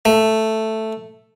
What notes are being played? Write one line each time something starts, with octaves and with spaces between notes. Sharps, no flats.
A3